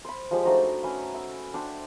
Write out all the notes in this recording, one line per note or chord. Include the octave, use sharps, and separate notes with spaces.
C5 B5
F3 G#3 G4
A3 D4 D#4 F#4
C#4 B4 F#5
E6
D4 C5 G5